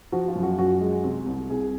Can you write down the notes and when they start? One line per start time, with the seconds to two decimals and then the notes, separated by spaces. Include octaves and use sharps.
0.12 F3 F#4
0.28 F4
0.35 F#2
0.43 F#4
0.58 F#2 F#4
0.81 G#3
1.04 C3
1.26 C2
1.50 C2 G#4